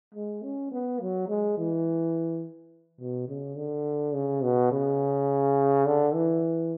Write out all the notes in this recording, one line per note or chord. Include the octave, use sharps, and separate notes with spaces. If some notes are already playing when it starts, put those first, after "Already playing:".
G#3
C#4
B3
F#3
G#3
E3
B2
C#3
D3
C#3
B2
C#3
D3
E3